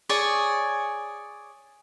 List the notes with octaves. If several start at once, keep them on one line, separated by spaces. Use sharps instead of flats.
G#4 C#5 D5